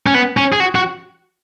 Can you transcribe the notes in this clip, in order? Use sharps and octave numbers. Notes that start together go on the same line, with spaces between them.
C#4
B3
C#4
G#4
F#4
F#4